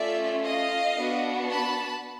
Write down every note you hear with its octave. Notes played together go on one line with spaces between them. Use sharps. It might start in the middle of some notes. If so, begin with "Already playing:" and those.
Already playing: A3 C#4 F4 D5 E5
D#5 F5
B3 D4 F#4
A5 B5